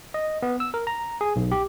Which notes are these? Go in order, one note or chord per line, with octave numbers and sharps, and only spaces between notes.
D#5
B3
E6
A#4
A#5
G#4
B1
G4